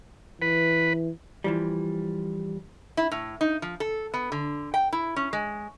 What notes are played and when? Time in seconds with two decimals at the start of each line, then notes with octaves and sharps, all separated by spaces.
0.42 E3 B4
1.44 E3 F3 G3
2.97 E4
3.12 A2
3.41 D#4
3.62 F3
3.80 A4
4.14 B3
4.32 D3
4.74 G5
4.93 E4
5.16 C#4
5.33 G#3